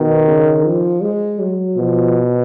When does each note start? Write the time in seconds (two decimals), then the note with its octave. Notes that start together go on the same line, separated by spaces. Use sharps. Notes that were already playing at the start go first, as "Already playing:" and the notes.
Already playing: B2 D#3
0.27 C#3
0.65 F3
1.02 G#3
1.40 F#3
1.77 B2 F3